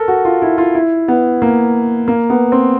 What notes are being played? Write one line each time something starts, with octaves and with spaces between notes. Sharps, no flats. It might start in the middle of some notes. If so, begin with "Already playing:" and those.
Already playing: A4 A#4
F#4
F4
E4
F4
E4
B3
A#3
A#3
B3
C4